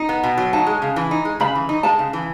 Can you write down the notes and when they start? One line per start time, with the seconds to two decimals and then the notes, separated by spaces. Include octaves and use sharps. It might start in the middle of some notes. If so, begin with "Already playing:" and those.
Already playing: D#4
0.09 B3
0.23 B2
0.38 F#3
0.53 D#4 A5
0.67 G#3
0.82 C#3
0.96 E3
1.11 D#4
1.25 G#3
1.40 C#3 B5
1.55 E3
1.69 D#4
1.83 G#3 A5
1.99 C#3
2.13 E3